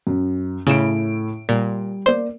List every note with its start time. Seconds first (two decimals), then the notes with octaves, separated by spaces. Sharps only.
0.07 F#2
0.67 A2 C#3 E4 D7 E7
1.49 A#2 G3
2.06 A#3 C5 D5